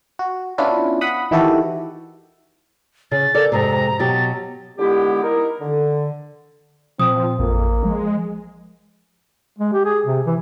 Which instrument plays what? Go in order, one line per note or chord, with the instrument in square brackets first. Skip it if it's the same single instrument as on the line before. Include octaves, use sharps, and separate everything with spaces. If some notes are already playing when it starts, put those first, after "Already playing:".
[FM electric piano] F#4
B3 C#4 D4 E4 F4 B4
F#5 B5 D#6
D#3 E3 E4 F#4 G4 A4
[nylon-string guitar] C#3 [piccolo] A6
[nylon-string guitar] A4 A#4 D5
[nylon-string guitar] F2 G#2 C3 [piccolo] A#5
[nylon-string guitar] B2 F#3 G4 [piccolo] A6
[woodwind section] A#2 D3 G#3 B3 E4 G4
D#4 E4 A#4
D3
[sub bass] A#2 [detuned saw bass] F3 [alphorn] C4 [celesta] D#6
[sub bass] A1 [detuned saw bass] F2 [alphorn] A#3
[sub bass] F3 [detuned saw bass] G#3
[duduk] G#3
G4
G#4
C3
E3